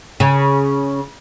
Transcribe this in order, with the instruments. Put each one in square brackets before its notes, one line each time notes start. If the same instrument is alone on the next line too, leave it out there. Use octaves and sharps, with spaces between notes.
[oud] C#3